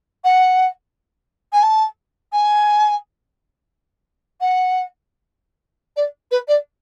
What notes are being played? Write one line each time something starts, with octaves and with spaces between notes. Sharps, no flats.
F#5
G#5
A5
G#5
F#5
D5
B4
D5